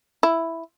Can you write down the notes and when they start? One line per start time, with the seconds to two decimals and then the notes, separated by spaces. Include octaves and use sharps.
0.23 E4